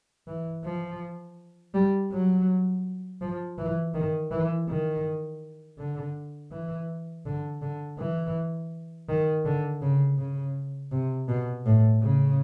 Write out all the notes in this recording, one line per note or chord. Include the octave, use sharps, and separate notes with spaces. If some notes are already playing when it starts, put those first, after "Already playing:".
E3
F3
G3
F#3
F3
E3
D#3
E3
D#3
D3
E3
D3
D3
E3
D#3
D3
C#3
C#3
C3
B2
A2
C#3